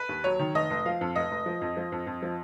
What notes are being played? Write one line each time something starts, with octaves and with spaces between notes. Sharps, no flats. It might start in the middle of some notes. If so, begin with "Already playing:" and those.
Already playing: B4
D#2
F#3 C#5
D#3
F1 D#5
F1
F3 F5
F2
F1 D#5
F1
F3
F2
F3
F2
F2
F3